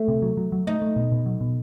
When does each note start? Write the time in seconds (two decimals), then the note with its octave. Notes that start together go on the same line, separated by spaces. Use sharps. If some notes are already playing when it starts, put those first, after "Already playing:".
Already playing: A3
0.08 C3
0.22 F#3
0.37 F#3
0.52 F#3
0.67 A3 D#4
0.82 A3
0.96 B2
1.12 B2
1.26 F#3
1.41 B2